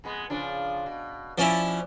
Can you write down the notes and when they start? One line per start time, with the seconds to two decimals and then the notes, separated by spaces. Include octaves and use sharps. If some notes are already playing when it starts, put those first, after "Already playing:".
0.04 F2 G#3 B3
0.30 C#3 F3 D4
0.86 B2
1.38 F3 C#4 E4 D5
1.65 B2